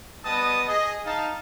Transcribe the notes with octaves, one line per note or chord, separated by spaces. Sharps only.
G3 B3 B4 D#5 A5 D#6
G#4 D#5
D#4 F5 A5